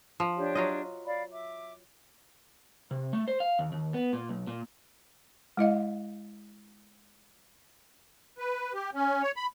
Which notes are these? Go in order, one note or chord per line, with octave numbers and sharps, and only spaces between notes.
F3
D4 G4 C#5
F#3 F4 D#5
D5 F5 B5
E5 D6
C3
A3
C5
F5
D#2
D#2
B3
A#2
B1
A#2
G#3 E4 D#5 F5
B4
G4
C#4
C#5
B5